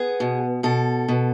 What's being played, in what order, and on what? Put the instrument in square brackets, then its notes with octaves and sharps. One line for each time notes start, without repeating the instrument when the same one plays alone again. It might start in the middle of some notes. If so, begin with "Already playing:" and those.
Already playing: [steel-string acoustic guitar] B3 G#4
B2
B2 A4
B2